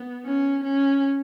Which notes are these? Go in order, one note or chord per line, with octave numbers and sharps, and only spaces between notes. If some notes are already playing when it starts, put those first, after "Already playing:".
Already playing: B3
C#4
C#4